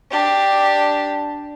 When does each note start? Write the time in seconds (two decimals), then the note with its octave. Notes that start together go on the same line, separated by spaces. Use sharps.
0.11 D4 G4